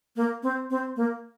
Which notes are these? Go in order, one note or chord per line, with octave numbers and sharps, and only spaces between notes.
A#3
C4
C4
A#3